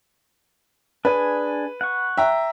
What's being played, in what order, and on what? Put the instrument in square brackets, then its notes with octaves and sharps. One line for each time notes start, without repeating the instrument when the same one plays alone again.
[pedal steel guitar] D4 G#4 G#5 [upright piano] B4
[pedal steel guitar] F#5 C#6
[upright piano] E5 G5 A#5